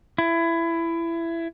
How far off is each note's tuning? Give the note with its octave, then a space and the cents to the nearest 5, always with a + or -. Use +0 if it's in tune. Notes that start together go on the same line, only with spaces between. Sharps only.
E4 +20